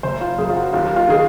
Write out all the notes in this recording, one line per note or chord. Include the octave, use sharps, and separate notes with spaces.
F#1 C5
F4
F#2 G#4
F4
F#4
D#2 F4
F4
D#3 G#4